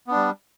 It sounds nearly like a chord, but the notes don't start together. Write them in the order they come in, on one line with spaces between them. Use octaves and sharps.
B3 D4 G3